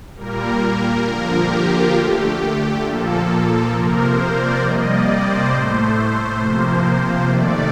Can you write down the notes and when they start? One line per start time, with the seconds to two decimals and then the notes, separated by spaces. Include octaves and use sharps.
0.17 A#2 G3 A#3 A#4
1.05 D3 F3 A#3 A#4
1.35 G4
1.64 F4
1.94 D3 A3 G4
2.83 A#2 F3 A#3 A4
3.71 C3 F3 A#3 A#4
4.01 C5
4.31 D5
4.60 C3 G3 A#3 D#5
4.91 D5
5.20 C5
5.50 A2 A3
6.38 C3 F3 A#3
7.27 C3 D#3 A3 D5